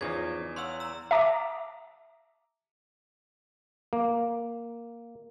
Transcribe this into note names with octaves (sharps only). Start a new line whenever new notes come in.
E2 C#3 F3 D#4 G#6
C#5 F5 F#5 C6 E6
A#5 E6
E5 A5 A#5 D6 D#6
A#3